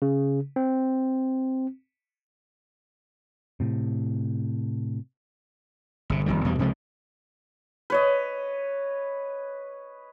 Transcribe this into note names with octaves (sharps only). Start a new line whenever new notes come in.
C#3
C4
A2 C3
G1 C3
D#1 F2 D#3 G3
E2 B2 G3
C#2 C3 F3 G#3
B4 C#5 D#5